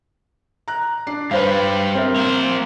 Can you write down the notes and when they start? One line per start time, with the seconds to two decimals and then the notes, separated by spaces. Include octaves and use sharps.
0.68 A#5 F#6
1.07 D4 C7
1.31 G2 G3 B4 C5 F5
1.94 C4 A#4 E5
2.16 A#3 C5